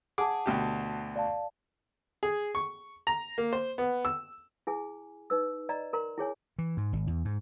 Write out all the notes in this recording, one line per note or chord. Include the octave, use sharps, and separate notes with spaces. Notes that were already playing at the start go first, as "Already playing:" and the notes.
G#4 F#5 A5 D6
D2 B2 G4
D5 F5 A5
G#4
C#6
A#5
A#3
C5
B3
E6
E4 G#4 G#5
D#4 B4 E6
D5 D#5 A#5
A#4 A#5 C6
E4 G#4 C#5 G#5
E3
G#2
G#1
E2
G#2